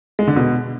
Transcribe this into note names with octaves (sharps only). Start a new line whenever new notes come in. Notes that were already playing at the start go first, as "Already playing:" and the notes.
G#3
D3
B2